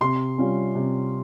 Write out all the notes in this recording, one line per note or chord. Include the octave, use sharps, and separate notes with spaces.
C3 C6
G3 C#4 F4
C3